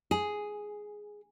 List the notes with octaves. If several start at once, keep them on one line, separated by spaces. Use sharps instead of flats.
G#4